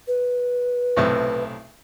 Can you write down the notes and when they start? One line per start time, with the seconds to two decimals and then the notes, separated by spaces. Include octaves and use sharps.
0.08 B4
0.97 B1 A2 C3